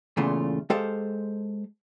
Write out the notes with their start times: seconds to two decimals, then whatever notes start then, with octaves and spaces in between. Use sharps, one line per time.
0.17 E2 A#2 C#3 A3 F4
0.70 G#3 G4 A4 C5 F5